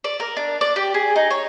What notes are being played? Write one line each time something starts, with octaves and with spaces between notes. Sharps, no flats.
D5
A#4
D4
D5
G4
G#4
D#4
C#5